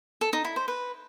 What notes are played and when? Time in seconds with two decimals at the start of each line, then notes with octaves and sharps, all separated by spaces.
0.21 A4
0.33 D#4
0.45 E4
0.56 C5
0.68 B4